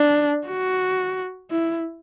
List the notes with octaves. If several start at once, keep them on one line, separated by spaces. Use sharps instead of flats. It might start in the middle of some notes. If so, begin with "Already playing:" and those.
Already playing: D4
F#4
E4